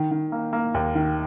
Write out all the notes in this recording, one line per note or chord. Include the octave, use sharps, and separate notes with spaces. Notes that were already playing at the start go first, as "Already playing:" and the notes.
Already playing: D#3
D#3
A#3
A#3
D#2
D#3